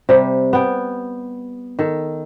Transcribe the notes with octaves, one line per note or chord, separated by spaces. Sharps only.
C3 G3
B3 G5
D#3 A4